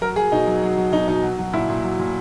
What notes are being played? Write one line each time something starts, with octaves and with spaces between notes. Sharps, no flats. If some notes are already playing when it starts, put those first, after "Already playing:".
F#3 A#4
F#3 G#4
B2 D#4
F#3
F#3
F#3
B2 D#4
B2 D#4
F#3
F#3
A#2 E4
A#2
F#3
A#2